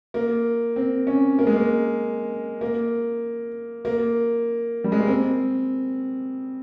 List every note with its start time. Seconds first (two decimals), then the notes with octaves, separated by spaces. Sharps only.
0.14 A#3
0.76 C4
1.07 C#4
1.39 A#3
1.47 G#3
1.56 A#3
2.61 A#3
3.85 A#3
4.84 G3
4.92 G#3
5.00 A#3
5.07 C4